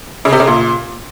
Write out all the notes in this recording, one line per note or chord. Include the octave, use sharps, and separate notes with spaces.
C#3
C3
C#3
A#2